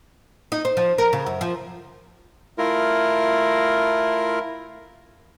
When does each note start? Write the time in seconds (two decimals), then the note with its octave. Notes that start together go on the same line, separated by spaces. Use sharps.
0.52 D#4
0.65 C5
0.77 F3
0.98 A#4
1.13 C#3
1.26 F#2
1.41 F3
2.58 A3 E4 F4 A#4